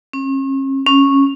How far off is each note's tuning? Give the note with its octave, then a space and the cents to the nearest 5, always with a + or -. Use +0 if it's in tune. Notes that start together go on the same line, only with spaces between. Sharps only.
C#4 -40
C#4 -10